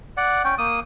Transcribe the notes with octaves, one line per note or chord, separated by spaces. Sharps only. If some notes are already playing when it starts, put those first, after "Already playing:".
D5 F#5
C#4 G5
A#3 D#6